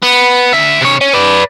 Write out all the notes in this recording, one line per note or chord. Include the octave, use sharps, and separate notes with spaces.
B3
D2 E5
C3 C#5
C#4
B4 D5